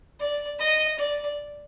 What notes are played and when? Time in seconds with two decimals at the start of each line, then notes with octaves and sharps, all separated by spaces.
0.20 D5
0.59 D#5
0.98 D5